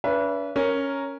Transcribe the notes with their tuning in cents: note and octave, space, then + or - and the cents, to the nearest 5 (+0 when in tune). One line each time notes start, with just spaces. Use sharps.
D4 -45 B4 -20 E5 +30
C#4 +0 A#4 +0